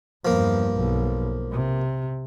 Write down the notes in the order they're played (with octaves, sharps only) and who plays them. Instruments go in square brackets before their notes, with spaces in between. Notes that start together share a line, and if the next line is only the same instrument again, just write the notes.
[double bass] E2 G2 [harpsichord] F3 A#3
[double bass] B1
C3